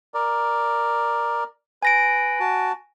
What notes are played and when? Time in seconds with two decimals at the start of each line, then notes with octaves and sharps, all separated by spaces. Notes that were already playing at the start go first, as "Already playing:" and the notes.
0.14 A#4 D5
1.83 B4 G#5 A#6 D7
2.40 F#4 A5